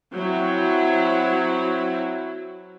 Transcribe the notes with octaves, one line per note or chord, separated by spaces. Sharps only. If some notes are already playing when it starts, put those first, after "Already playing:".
F#3 C4 E4